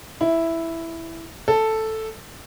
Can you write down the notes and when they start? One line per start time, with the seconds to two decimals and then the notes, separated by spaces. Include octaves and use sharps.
0.21 E4
1.48 A4